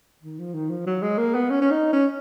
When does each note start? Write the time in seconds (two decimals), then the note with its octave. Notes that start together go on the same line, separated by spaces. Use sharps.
0.23 D#3
0.39 F3
0.54 D#3
0.70 F3
0.86 F#3
1.02 G#3
1.18 A#3
1.34 B3
1.50 C#4
1.61 C#4
1.71 D#4
1.93 C#4